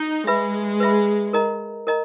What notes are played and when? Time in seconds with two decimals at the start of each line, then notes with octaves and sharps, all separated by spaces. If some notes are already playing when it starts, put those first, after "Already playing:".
Already playing: D#4
0.27 G#3 B4 E5 B5
0.80 B4 E5 B5
1.33 A#4 D#5 A#5
1.87 A#4 D#5 A#5